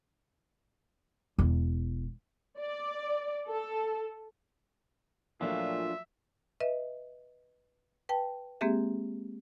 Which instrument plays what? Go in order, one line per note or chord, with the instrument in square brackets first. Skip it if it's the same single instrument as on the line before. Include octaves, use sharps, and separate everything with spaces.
[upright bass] E1
[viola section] D5
A4
[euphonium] A#2 [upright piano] F3 F#3 A3 [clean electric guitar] D4 F4 [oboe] E5
[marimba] B4 D#5 E5
B4 G5 A5
G#3 A#3 C4 G4 G#4 E5